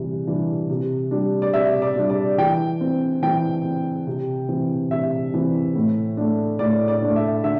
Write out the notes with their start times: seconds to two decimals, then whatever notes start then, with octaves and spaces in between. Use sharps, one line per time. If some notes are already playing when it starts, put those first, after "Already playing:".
Already playing: C3 E3 G3
0.27 E3 G3 D4
0.70 C3
1.11 G3 D4
1.42 D5
1.53 C3 E5
1.82 D5
1.96 G3 D4
2.10 D5
2.38 E3 G5
2.81 C4
3.23 E3 G5
3.65 C4
4.07 C3
4.49 E3 C4
4.91 C3 E5
5.34 E3 C4
5.75 A2
6.17 A3 D4
6.59 A2 D5
6.88 D5
7.02 A3 D4
7.16 E5
7.44 D3 E5